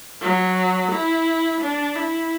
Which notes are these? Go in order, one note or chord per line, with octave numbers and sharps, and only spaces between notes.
F#3
E4
D4
E4